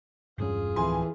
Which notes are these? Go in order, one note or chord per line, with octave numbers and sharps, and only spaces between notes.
E1 G2 C#4 F4 G#4
D1 F2 E3 G#5 C6